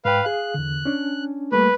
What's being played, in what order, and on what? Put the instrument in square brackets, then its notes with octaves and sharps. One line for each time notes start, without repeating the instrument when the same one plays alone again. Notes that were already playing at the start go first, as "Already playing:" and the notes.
[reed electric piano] G#2 G5 [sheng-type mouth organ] B4 F5
[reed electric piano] G#4 F5 [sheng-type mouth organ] F#6
[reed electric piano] E2 D3
C#4 D4
[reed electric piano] G3 A3 A#3 [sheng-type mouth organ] B4